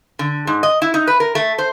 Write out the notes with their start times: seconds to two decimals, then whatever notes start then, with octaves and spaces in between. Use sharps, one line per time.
0.19 D3
0.47 G#2
0.63 D#5
0.82 E4
0.94 D#4
1.07 B4
1.20 A#4
1.35 A3
1.58 C5